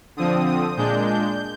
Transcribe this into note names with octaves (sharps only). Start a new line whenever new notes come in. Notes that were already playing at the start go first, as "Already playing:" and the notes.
D3 F3 C4 D#6
D#6
A#2 G#3 D4 G6
G6